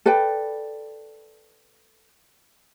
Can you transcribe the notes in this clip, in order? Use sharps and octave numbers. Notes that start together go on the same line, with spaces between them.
A4 B4 D5 G5